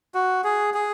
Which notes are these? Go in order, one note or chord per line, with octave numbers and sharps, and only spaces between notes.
F#4
G#4
G#4